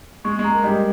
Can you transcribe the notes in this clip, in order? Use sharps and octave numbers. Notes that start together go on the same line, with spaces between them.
G#3 C#6
G#3
A#5
A#3
G3 G#3 D#5